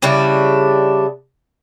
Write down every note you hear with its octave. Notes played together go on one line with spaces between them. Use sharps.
C#3 G3 D4 E4